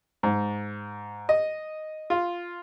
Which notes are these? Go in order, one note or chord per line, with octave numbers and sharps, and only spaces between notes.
G#2
D#5
F4